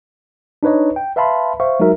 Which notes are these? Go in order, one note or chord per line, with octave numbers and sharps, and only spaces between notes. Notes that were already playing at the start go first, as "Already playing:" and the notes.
D4 D#4 B4 C#5 D#5
G5
B4 E5 F5 A5 B5 C6
C5 E5 F5 C#6
F#3 G#3 D#4 F#4 A#4 E5